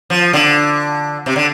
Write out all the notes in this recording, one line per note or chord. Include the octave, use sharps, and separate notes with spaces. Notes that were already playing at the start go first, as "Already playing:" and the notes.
F3
D3
C3
D3